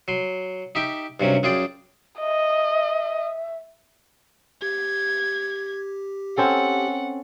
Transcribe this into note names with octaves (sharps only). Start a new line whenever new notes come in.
F#3 C6
D#4 G4 E5 G5
G2 C3 F#3 C#4
F#2 F4 G#4 D5 G5
D#5 E5
G4 G#6
C4 C#4 A4 F#5